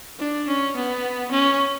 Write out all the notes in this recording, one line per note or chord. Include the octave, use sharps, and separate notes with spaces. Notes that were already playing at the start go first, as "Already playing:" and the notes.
D4
C#4
B3
C#4